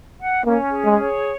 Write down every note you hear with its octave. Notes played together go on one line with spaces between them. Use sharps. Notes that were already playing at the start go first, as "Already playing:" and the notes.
F#5
A#3 C#4
G#4
G#3
C#5